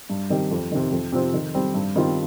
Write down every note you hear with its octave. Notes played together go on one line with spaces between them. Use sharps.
G2
D#3 C4 G4
F2
C3 D#3
F2
C3 F3 C4
D#3
G3 C4
G2
D#3 G3 C4 F4